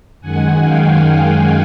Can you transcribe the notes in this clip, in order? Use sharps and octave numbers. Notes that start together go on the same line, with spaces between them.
F#2 D#3 G#3 F#5 G#5
F5 G5